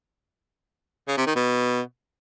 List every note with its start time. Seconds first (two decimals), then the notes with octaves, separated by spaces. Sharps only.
1.08 C#3
1.17 C3
1.26 D#3
1.36 B2